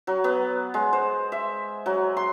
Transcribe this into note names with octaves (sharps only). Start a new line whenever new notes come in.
F#3
B3
G#3
C5
E5
F#3
C6